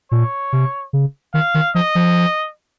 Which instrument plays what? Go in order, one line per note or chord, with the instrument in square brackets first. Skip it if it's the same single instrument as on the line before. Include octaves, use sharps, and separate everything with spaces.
[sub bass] A#2 [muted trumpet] C#5
[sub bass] C3
C#3
[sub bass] D#3 [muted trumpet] F5
[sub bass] D#3
[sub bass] F3 [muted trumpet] D#5
[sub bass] F3